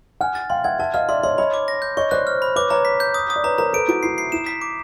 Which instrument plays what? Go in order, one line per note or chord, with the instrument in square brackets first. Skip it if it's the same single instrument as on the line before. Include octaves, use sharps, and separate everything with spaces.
[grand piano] F#5 G#5 [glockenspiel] F6
[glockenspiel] A6
[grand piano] F5 G5 [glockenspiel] C6
[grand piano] E5 F#5 [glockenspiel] G#6
[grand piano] E5 F#5 [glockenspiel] A5
[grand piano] D#5 F5 [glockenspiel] F6
[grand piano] D5 E5 [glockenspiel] C6
[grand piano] C#5 D#5 [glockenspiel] C6
[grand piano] C#5 D#5 [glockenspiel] B5
[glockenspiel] D6
A#6
G6
[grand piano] C#5 D#5 [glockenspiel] C#6
[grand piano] C5 D5 [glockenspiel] F#6
[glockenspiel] F6
B5
[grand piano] B4 C#5 [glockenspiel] D6
[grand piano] B4 C#5 [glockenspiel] A#5
[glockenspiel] B6
G6
D#6
D#6
[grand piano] D5
[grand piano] B4 C#5 [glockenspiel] A#5
[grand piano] A#4 C5 [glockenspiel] A#5
[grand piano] A4 B4 [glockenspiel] D7
[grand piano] E4 F#4 [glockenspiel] D7
[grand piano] E4 [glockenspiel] C7
[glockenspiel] C7
[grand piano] E4 [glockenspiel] E7
[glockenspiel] B6
D6